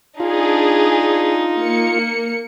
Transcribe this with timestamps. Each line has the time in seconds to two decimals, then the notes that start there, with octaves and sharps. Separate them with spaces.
0.20 D4 D#4 F4 G#4
1.61 A#3 C#7